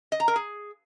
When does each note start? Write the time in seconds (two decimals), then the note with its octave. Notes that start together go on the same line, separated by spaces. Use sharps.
0.12 D#5
0.20 A#5
0.28 A#4
0.36 G#4